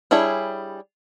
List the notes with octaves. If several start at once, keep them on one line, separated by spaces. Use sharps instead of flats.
G3 D4 E4 G#4 C#5